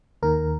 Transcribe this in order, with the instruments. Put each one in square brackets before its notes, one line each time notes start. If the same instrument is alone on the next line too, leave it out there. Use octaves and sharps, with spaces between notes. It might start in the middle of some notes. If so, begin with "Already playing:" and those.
[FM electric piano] D#2 D#3 A#4